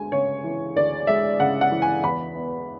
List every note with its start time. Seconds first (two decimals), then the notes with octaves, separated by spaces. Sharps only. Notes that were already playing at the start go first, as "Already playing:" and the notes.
Already playing: D2 G#3 G#5
0.12 C#3 C#5
0.44 E3
0.76 D2 D5
1.07 G#3 E5
1.40 C#3 F#5
1.61 F#5
1.72 E3
1.82 G#5
2.04 E2 B5
2.36 B3